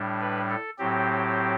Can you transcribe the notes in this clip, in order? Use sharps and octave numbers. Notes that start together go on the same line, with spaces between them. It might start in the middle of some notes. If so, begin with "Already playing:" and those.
Already playing: A2 G3 D4
B4
A4
A2 F#3 C4 G4